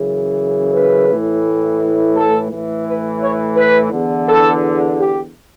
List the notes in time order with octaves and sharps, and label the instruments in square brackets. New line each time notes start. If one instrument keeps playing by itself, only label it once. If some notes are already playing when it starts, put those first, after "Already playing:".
Already playing: [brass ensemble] F#2 C#3 E3
B4
A2 E3
A4
A2 E3
B4
C#5
B4
E2 D3
A4
G4